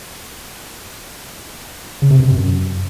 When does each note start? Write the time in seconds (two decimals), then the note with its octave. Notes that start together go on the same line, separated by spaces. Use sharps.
2.02 C#3
2.11 C3
2.19 G2
2.28 C3
2.37 F#2